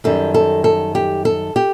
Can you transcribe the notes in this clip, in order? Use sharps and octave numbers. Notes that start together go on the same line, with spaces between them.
F#2 D#3 G3 A4
A4
A4
G4
A4
G4